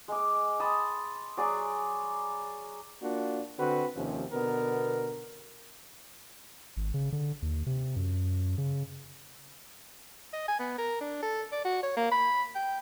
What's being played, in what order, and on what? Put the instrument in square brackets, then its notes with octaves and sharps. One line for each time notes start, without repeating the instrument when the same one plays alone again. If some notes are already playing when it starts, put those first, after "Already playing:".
[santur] G#3 D6
A5 B5 C6 D#6
F#3 G#4 D5
[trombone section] A#3 D4 F4 F#4
D3 C4 F#4 B4
D#2 C3 F3 C#4
B2 D3 B3 A#4
[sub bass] G#1
C#3
D3
D#2
C3
F#2
C#3
[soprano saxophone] D#5
G#5
B3
A#4
D4
A4
D5
F#4
C#5
A#3
B5
G5